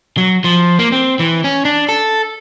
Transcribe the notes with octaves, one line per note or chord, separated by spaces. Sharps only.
F#3
F3
A#3
C4
E3
C#4
D4
A4